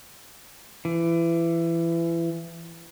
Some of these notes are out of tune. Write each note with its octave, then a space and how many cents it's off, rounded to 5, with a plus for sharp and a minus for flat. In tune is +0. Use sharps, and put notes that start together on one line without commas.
E3 +25